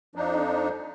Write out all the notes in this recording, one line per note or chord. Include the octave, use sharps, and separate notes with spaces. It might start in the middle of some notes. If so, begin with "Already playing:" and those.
F2 F3 D4 D#4